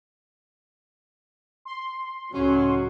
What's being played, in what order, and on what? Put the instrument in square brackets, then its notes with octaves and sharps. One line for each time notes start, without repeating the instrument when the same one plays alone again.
[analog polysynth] C6
[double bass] C#2 A2 [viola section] F#3 [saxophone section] C#4